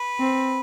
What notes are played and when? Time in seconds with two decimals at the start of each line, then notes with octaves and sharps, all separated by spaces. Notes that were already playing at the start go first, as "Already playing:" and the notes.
Already playing: B4
0.19 C4